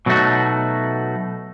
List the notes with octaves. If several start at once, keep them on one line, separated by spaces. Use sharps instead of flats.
B2 F#3 A3 D#4 F#4